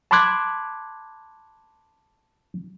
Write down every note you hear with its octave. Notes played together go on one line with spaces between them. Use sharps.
A5 B5 C6 D6 F#6 G#6